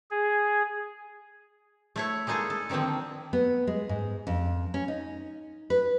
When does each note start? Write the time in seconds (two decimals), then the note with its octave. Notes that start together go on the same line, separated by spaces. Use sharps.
0.11 G#4
1.96 A3 E4 C#5
2.27 G#3 A#3 D#4 G#4 A4
2.50 A4
2.70 D3 D#3 F3 A#3 C4
3.33 B3
3.67 G#3
3.89 G#2
4.27 F2
4.74 C#4
4.88 D#4
5.70 B4